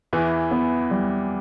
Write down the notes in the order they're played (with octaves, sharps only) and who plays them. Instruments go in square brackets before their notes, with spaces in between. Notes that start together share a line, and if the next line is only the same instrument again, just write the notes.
[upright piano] E2 E3 [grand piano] E4
[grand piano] B3
G3